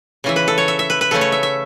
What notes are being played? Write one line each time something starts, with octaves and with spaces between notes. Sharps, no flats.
C#3 E3 C#4 E5
B4
A4
C#5
E5
E5
B4
B4
C#3 A3 C#4 A4
C#5
E5
E5